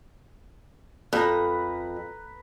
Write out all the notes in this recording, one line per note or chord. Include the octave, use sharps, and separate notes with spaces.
F2 B4 A#5